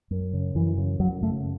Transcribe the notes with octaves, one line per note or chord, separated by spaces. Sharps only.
F#2
C#3
F#2 E3
C#3
F#2 F#3
C#3 A3